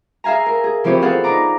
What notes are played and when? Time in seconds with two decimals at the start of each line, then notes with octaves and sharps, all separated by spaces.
0.24 G#4 E5 F5 G#5 A#5
0.46 A#4
0.64 G#4
0.84 E3 F3 C4 G4 C#5
1.02 B3 G#4 A4 F5 F#5
1.24 D4 D#4 A#5 D6